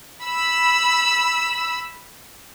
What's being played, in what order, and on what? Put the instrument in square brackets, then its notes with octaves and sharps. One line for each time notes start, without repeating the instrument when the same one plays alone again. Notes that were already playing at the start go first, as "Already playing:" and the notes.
[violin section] B5 E6